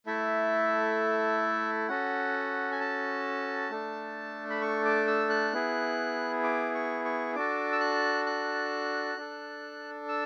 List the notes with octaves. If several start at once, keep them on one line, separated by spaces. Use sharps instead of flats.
A3 E4 A4 E5
C#4 F#4 A4 F#5
G#5
A5
A3 D4 A4
B5
C#6
D6
E6
F#6
B3 E4 G#4
D6
C#6
C#6
D4 F#4 A4 D6
E6
F#6
F#6
D4 A4
E6